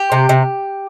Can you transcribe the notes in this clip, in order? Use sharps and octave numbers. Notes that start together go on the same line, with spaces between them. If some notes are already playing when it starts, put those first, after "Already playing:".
Already playing: G4
C3
C3